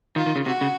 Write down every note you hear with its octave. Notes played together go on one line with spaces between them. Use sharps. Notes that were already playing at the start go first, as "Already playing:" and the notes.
D#3 F4
D#3
C#3
C3 F#4
C#3